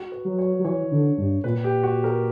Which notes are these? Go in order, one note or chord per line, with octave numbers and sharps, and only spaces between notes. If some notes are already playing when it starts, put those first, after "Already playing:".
Already playing: F#4
B4
F#3
C#5
F#3
E3 C#5
D3
G2
A#2 B4
G4
F#4
A#4